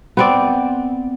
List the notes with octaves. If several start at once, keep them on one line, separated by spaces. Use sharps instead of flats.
B3 C4 D5